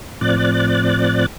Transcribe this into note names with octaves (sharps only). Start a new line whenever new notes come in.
A2 F3 C4 D5 F#6 A6